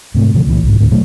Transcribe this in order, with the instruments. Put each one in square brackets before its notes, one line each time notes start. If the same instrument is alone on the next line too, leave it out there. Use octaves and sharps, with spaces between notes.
[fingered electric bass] G#2 C3 A3
B2 D3 E3 F3
C#2 A#2 E3
C2 G#2
D2 A2 C3
B2 F#3 A3